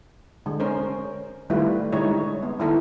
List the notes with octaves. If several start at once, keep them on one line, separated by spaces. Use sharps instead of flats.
D3 G#3
C#4 A#4 C5
D#3 G3 A3 E4 F4 B4
D3 G3 G#3 D#4 E4 C#5
B3
D#3 E3 A#3 E4 A4 A#4